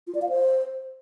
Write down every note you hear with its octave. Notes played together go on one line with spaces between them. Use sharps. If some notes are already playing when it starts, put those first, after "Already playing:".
F4
D5
F5
C5